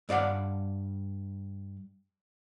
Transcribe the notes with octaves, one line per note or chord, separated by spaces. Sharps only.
G2 D5 F5 F#5